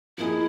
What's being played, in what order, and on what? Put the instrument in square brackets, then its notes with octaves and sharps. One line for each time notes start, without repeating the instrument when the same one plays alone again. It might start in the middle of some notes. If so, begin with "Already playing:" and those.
[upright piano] F3 A#3 D#4 G#4 [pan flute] E4